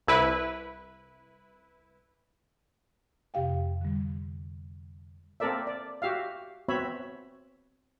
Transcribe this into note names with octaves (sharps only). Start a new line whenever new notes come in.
C2 E4 B4
F2 C3 G4 F5 G5
D3 G3
A#3 C4 A4 A#4 D5 E5
D5
F#4 G4 E5 F5
B3 C4 F#4 C#5 E5 B5